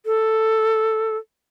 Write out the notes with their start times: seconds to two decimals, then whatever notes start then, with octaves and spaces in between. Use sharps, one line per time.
0.06 A4